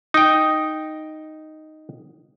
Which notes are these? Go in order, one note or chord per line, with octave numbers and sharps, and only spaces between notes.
D#4 G5